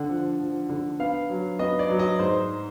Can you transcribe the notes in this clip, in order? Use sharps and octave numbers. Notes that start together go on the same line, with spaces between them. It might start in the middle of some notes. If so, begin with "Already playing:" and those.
Already playing: D3 F#5
F3
F3
D3
B3 F5
F#3
B3 D#5
D5
F#3
D#5
G#2 C5